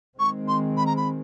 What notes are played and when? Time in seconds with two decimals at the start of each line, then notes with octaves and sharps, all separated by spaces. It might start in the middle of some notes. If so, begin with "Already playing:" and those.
0.19 D#3 G#3 C4 C#6
0.48 C6
0.77 B5
0.86 A#5
0.97 B5